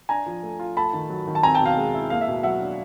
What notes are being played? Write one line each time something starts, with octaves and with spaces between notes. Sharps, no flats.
D4 G#5 A#5
F3
A3
F4
A3 A5 B5
D#3
F#3
D#3
A5
C4 G#5 A#5
G5 A5
B2
F5 G5
G#3
E4
A#3 F5
E5
B2
F#3 E5 F#5
D4